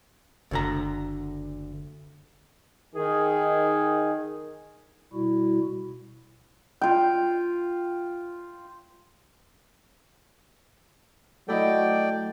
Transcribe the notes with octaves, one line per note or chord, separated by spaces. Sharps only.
F#1 D2 D3 A#5
D#3 G#4
B2 G3 E4 F#4
F4 G5
F#3 A3 E4 A4 D5 D#5 G5